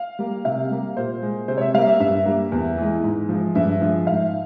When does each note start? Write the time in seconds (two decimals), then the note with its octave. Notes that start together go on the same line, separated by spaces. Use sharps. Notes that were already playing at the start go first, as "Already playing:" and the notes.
Already playing: F5
0.19 G3 A#3
0.45 C3 F5
0.71 G3 A#3
0.96 A#2 C5
1.22 G#3
1.48 C3 C5
1.58 C#5
1.61 E5
1.74 G3 A#3 F5
1.87 E5
2.00 G2 E5
2.26 G3 A#3
2.52 E2
2.78 E3 G#3
3.04 G#2
3.29 F3 G#3
3.55 G2 E5
3.81 F3 G#3
4.07 G#2 F5